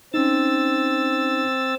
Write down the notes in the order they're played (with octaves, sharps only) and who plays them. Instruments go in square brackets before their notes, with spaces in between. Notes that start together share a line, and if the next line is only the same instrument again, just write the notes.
[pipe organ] C4 E6 A6 [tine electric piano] C#4 D#4